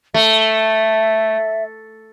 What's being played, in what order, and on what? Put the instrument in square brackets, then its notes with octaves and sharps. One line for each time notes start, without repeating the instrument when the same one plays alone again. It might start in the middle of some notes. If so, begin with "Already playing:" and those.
[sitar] A3 [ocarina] E5